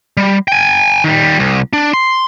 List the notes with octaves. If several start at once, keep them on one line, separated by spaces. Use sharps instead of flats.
G3
G5 G#5
D#3 G3
C2
D4
C6